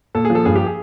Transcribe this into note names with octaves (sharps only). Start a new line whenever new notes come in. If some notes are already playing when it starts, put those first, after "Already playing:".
A#2 A4
G#4
F3
A4
G2 G#4
G4
G#4